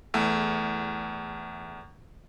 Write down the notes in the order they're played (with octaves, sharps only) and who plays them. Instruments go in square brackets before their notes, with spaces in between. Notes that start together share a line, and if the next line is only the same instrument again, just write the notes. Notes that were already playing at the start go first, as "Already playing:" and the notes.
[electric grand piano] E2 A3